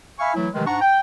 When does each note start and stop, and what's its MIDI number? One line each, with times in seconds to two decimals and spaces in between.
0.19 0.33 76
0.19 0.33 77
0.19 0.33 80
0.19 0.33 83
0.19 0.33 85
0.35 0.48 52
0.35 0.48 54
0.35 0.48 57
0.35 0.48 64
0.54 0.66 48
0.54 0.66 51
0.54 0.66 52
0.54 0.66 54
0.54 0.66 56
0.54 0.66 57
0.66 0.78 44
0.66 0.78 62
0.66 0.78 78
0.66 0.78 82
0.66 0.78 85
0.82 1.00 79